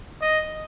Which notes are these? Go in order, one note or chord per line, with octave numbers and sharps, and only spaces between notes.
D#5